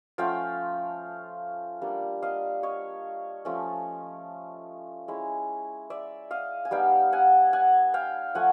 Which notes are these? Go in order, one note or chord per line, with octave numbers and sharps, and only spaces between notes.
F3 A3 C#4 F4 F5 G5
G3 A#3 D4
D#5 F5
C#5 D#5
F3 A3 C#4
G#3 C#4 E4
D5 E5
D#5 F5
G#5
G3 B3 D#4 F5 G5
F#5 G#5
F#5 G#5
F5 G5
F3 A3 F#5 G#5